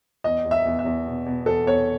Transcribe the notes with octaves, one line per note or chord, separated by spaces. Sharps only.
E2 D#5
E2
E5
E2
E5
E2
B2
B2
E2 A4
E2 C#5